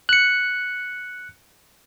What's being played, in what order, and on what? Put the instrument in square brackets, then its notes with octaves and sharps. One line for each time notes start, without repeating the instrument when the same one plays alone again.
[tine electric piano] F#6 C#7